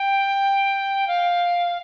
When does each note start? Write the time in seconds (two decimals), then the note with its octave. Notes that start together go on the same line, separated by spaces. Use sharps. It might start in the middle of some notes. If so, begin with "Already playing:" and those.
Already playing: G5
1.08 F5